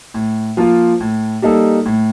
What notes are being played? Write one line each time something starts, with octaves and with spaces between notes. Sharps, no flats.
A2
F3 A#3 F4
A2
G3 A#3 D#4 A4
A2